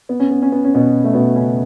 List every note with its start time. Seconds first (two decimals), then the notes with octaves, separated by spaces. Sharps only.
0.09 B3
0.20 C#4
0.31 B3
0.42 C#4
0.52 B3
0.64 C#4
0.74 B2 B3
1.04 A3
1.14 B2 B3
1.36 C#3 C#4